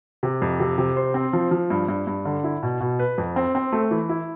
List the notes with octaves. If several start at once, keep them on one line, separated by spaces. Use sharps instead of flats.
C3
F2
C3
C3
C5
C4
F3
F3
G2
G2
G2
D3
E4
B2
B2
B4
F2
C4
C4
A3
E3
E4